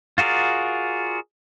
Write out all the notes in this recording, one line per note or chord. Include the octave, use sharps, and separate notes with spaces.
F4 F#4 G#4 A#4 D5